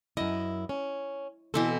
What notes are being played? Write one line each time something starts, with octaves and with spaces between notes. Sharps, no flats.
F#2 E4 D#5
C#4
B2 E3 C4 A4